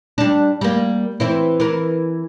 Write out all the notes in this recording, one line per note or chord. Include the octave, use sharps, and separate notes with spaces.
G3 D4
G3 A#3
E3 C4 E4
E3 A#4